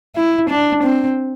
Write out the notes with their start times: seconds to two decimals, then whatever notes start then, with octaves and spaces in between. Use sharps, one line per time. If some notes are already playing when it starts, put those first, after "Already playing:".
0.16 E4
0.49 D4
0.83 C4